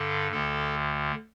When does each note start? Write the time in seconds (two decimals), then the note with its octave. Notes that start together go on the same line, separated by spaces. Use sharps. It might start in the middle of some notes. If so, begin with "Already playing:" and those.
Already playing: G2 D3 A4
0.31 D2 D3 A4